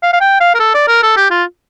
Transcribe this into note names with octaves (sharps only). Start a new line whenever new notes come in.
F5
F5
G5
F5
A#4
A4
D5
A#4
A4
G4
F4